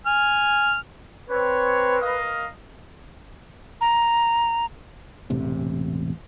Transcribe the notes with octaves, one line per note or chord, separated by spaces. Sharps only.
G#5 F6
C4 B4 C#5
A#4 D#5 F5
A#5
E1 A1 C3